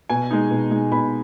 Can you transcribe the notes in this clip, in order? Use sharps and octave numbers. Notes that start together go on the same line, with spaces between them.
B2 G#5
G#3 D#4
B2
G#3 D#4
B2 B5